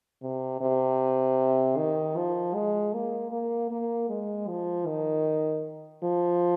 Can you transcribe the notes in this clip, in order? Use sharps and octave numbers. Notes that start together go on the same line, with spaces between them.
C3
C3
D#3
F3
G#3
A#3
A#3
A#3
G#3
F3
D#3
F3